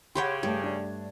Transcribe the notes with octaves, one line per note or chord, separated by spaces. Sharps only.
C#3 G4 C#5 F#5 G5 B5 C6
G2 A3 G4 A5 G#6
D4